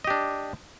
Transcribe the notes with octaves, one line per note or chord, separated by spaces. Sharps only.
D4 G4 D#5